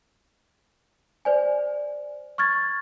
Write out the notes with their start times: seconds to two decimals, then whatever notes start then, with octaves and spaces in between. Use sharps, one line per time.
1.25 C5 D5 G#5
2.38 C#6 F6 G#6 A6